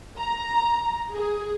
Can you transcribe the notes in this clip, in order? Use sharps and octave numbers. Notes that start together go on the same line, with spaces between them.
A#5
G#4